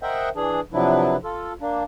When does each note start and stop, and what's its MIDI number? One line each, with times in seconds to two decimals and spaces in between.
0.02 0.29 70
0.02 0.29 72
0.02 0.29 75
0.02 0.29 76
0.02 0.29 78
0.02 0.29 79
0.36 0.60 52
0.36 0.60 62
0.36 0.60 68
0.73 1.16 48
0.73 1.16 53
0.73 1.16 54
0.73 1.16 62
0.73 1.16 64
0.73 1.16 71
1.24 1.53 65
1.24 1.53 69
1.61 1.83 58
1.61 1.83 62